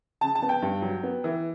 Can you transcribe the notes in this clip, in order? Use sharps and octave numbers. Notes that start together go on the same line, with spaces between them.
C#3 A5
A5
B3
G5
G2
F#3
B3
E3